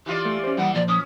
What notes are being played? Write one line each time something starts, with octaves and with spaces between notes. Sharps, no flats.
E3 F4 G4 D5
A3
C#4 C5
E3 G3 A#3 F#5
A#2 F3 D5
C#4 D#6